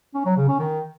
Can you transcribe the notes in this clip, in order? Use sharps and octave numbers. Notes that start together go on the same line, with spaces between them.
C#4
F#3
C#3
C#4
D#3